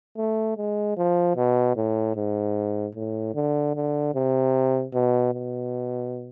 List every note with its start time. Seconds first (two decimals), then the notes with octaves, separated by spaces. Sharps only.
0.18 A3
0.57 G#3
0.97 F3
1.36 B2
1.76 A2
2.16 G#2
2.95 A2
3.35 D3
3.75 D3
4.15 C3
4.94 B2
5.34 B2